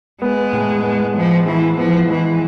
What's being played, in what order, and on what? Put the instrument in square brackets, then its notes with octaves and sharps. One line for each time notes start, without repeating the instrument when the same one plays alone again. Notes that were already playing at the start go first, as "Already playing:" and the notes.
[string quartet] G#3 [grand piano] B3
[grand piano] A2
B3
[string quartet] F3 [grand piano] G#3
[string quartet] E3 [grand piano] E4
[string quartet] F3 [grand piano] B3
[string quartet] E3 [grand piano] G#3